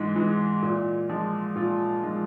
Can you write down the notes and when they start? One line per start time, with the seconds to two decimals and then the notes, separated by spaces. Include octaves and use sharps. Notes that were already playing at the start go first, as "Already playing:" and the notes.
Already playing: G#2 E3 G#3
0.16 E3 G#3
0.62 A#2
1.09 F3 G#3
1.55 A#2 F4
2.03 F3 G#3